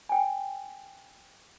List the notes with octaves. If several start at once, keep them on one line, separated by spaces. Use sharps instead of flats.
G5 G#5